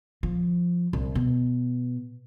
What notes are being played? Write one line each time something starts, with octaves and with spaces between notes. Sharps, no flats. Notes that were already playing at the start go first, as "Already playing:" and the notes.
F3
C2
B2